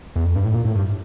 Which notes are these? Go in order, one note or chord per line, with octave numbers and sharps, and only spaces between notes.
E2
F2
G2
A2
A#2
A2
G2